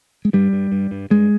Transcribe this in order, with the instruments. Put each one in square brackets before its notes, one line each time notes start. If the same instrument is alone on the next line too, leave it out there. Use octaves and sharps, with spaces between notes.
[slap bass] G#3
G2 G3
G2
G2
G2
G2 G#3